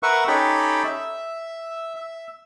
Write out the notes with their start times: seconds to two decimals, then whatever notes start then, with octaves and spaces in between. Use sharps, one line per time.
0.03 A#4 B4 E5 F#5 C#6
0.28 C#4 D#4 G4 A4 G5 B5
0.84 E5
1.96 E5